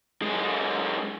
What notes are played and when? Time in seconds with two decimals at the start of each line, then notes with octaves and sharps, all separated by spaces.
0.22 F#2 G#3